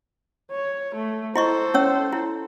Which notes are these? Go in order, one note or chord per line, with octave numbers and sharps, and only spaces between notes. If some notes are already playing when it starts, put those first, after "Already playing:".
C#5
A3
E4 A4 C5 D#5 C#6
C#4 C#5 E6
E4